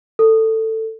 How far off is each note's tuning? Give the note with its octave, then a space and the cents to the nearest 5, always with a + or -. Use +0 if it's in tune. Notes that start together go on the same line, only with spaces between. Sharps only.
A4 +15